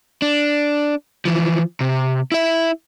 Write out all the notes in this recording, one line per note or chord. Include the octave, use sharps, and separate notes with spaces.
D4
E3 F3
C3
E4 E5